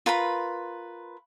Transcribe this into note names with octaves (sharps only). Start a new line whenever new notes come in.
F4 A#4 B4 B5